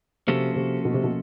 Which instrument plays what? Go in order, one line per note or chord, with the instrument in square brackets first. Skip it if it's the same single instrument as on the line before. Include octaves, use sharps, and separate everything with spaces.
[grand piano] C3 [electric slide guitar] F3 A#3 C#4 F#4 A4
[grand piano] C3
B2
C3
B2